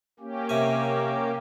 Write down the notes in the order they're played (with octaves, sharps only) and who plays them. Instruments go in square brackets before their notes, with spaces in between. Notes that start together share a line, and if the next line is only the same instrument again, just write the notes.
[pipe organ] A#3 C#4 G4
[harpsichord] C3 G#5